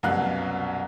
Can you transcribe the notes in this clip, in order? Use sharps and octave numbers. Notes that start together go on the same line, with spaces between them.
C2 F#2 B2 F#3 F5 F#6